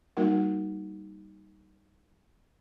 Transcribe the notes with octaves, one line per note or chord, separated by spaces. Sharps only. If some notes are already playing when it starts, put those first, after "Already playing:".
G3 A#3 D#4 F#4 A#4 F#5